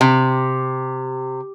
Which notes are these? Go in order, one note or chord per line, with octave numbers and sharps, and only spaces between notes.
C3